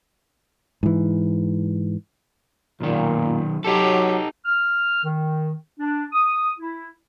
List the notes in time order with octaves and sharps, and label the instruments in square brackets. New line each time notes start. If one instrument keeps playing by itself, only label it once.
[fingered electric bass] G#2 E3
[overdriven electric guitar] B1 D#3 [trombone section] A#2
[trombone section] F#3 [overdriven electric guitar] D#4 A4 [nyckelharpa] G4
[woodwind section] F6
D#3
D4
D#6
E4